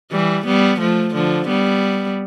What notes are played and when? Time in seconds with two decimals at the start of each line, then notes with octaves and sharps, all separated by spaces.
0.12 E3 G3
0.46 G3 B3
0.79 F3 A3
1.14 D3 F3
1.48 G3 B3